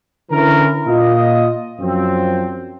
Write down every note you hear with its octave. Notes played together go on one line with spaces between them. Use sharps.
D3 E3 C#4 E4 A#4
A#2 F4 D#5
F#2 F3 C4